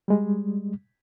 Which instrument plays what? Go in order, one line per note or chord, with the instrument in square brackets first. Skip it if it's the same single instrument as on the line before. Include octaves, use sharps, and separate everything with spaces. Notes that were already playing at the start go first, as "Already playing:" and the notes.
[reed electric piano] G3 G#3